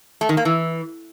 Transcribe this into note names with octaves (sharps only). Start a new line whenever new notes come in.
A3
D#3
A#3
E3